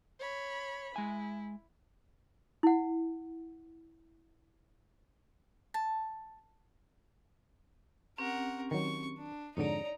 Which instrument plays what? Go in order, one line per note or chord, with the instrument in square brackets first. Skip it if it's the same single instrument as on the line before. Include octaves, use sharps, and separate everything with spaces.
[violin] C#5 B5
[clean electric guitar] G#3 G#5 [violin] E4
[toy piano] E4 F#5
[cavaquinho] A5
[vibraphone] C4 C#4 G4 [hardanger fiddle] A#4 F#5
[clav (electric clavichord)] D#3 F#3 [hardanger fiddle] C#6
[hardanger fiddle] D4
[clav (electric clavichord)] F2 G#2 D3 [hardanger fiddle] D#4 A#5 [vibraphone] C#5 D5